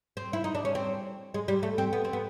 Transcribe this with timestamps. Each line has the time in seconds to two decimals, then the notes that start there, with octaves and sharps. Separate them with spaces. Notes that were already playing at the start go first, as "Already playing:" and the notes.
0.17 C4
0.33 E4
0.44 D#4
0.55 D4
0.65 C#4
0.75 C4
1.34 G#3
1.48 G3
1.63 A3
1.78 C4
1.93 B3
2.05 C4
2.13 B3